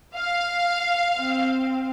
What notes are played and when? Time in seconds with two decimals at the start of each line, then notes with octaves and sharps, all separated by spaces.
0.16 F5
1.16 C4